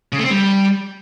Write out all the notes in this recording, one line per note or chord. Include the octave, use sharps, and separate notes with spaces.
C#3
A3
C4
G3